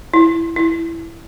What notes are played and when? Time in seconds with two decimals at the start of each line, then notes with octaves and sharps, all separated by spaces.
0.14 E4
0.56 E4